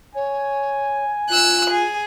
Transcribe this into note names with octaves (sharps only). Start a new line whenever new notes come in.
C#5 G#5
F4 E6 F#6
G#4